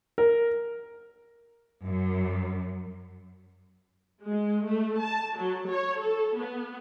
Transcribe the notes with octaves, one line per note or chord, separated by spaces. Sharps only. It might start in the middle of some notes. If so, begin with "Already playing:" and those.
A#4
F#2
G#3
A3
A5
F#3
C#5
A4
B3